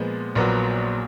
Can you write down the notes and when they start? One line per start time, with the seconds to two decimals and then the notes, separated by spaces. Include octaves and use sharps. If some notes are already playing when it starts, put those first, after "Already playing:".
Already playing: A#2 F3 G#3 B3
0.35 A#1 A#2 F#3 B3